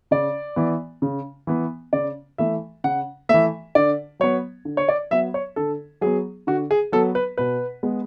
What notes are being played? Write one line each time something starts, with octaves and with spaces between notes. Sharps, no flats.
C#3 D5
E3 B3
C#3
E3 B3
C#3 D5
E3 A3 E5
C#3 F#5
E3 A3 E5
D3 D5
F#3 B3 C#5
D3
C#5
D5
F#3 B3 E5
C#5
D3 A4
F#3 B3 G#4
D3 F#4
G#4
F#3 B3 A4
B4
B2 B4
G#3 B3